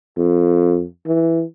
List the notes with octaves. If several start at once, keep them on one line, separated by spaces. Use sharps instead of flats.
F2
E3